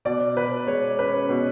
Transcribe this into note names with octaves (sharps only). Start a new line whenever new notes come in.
B2 D5
B2 B4
G#3 C#5
C#4 B4
B2